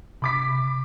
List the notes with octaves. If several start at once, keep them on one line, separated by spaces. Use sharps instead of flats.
C3 B5 D6 B6